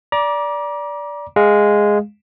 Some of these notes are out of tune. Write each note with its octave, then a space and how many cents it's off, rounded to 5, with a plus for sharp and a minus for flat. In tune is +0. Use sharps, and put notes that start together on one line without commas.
D5 -15 A#5 +35 D6 +0
G#3 -5 F5 +0